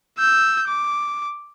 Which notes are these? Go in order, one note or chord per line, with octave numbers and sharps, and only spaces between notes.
E6 G6
D6